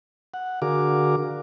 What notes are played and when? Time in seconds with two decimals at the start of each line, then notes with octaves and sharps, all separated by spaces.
0.34 F#5
0.62 D3 F#4 G#4 A#4 F5 D6